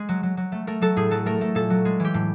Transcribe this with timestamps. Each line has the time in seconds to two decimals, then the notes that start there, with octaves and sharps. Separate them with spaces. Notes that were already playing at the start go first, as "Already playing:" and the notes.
Already playing: G#3
0.09 F#3
0.23 F#3
0.37 F#3
0.52 A3
0.67 A3 A#4
0.81 F#3 A4
0.96 A2 G#4
1.11 F#3 A4
1.26 A3 A#4
1.41 A3
1.55 A#2 A4
1.70 F#3
1.85 G#3
2.00 E3 G4
2.14 A2